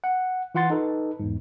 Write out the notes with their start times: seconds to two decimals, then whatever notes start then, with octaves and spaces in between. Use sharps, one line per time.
0.04 F#5
0.55 E3 F4 F#5 C6 A6
0.70 D#4 A4 B4
1.20 E2 G#2